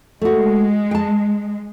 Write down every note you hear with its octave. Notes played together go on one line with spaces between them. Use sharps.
G#3 A3 F#4
G5 A5